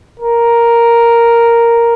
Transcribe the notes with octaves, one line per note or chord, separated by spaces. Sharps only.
A#4